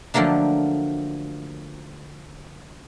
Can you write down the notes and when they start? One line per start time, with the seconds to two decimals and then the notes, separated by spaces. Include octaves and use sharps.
0.14 D3 F3 F#3 A3 A#3 D4